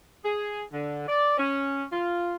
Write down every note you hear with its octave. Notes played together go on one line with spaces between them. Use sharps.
G#4
D3
D5
C#4
F4